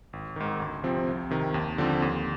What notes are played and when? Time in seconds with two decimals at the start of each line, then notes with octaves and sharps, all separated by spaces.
0.13 G#1
0.36 G#2 D#3
0.60 D2
0.84 C3 F3 C4
1.08 C2
1.31 C3 D#3
1.54 D#2
1.78 D3 F3 C4
2.02 D#2